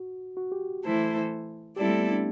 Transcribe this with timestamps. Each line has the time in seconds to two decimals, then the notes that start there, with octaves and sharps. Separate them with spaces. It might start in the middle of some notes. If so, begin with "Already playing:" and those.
Already playing: F#4
0.37 F#4
0.52 G4
0.83 E3 A3 E4 A4 C5
1.76 G3 C4 E4 G4 A4 D5
1.89 A3
2.00 B3
2.12 D4